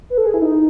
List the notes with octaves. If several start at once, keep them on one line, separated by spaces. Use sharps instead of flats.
B4
A4
G#4
E4
D#4